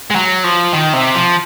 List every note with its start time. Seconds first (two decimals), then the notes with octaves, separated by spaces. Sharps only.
0.10 G#3
0.16 F#3
0.44 F3
0.73 D#3
0.93 C3
1.15 F3